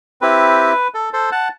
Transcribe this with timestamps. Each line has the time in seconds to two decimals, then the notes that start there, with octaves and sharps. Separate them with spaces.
0.21 C4 E4 G4 B4
0.94 A4
1.13 A4 C5
1.32 F#5 A5